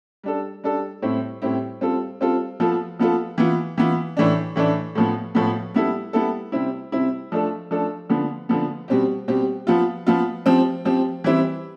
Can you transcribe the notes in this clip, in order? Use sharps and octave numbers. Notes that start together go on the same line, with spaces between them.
G3 D4 A4
G3 D4 A4
A2 G3 C4 E4 G4
A2 G3 C4 E4 G4
G3 C4 F4 A4
G3 C4 F4 A4
F3 B3 F4 A4
F3 B3 F4 A4
E3 B3 F4
E3 B3 F4
A2 E3 A3 D4
A2 E3 A3 D4
A2 F3 B3
A2 F3 B3
G3 B3 E4 A4
G3 B3 E4 A4
C3 G3 C4 E4
C3 G3 C4 E4
F3 A3 D4 A4
F3 A3 D4 A4
D3 F3 B3
D3 F3 B3
B2 G3 C4 G4
B2 G3 C4 G4
F3 B3 F4
F3 B3 F4
F3 C4 G4
F3 C4 G4
E3 G3 C4 E4